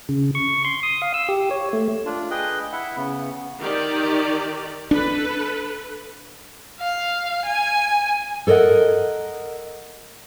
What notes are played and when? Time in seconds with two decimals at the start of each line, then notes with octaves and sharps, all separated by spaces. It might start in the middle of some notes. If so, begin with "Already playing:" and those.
0.09 C#3
0.35 C#6
0.65 C6
0.83 D#6
1.02 F5
1.14 E6
1.29 G4
1.51 C#5
1.73 A3
2.06 D4 F4
2.31 G#4 B4 D#5 G5
2.72 E4 E5 F#5
2.97 C#3 B3
3.62 D#3 G4 D5
4.91 D4 A4 B4
6.80 F5
7.46 G#5
8.47 A4 A#4 D5 D#5 F#5